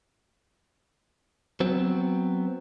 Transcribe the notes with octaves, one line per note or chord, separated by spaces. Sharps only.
F#3 B3 C4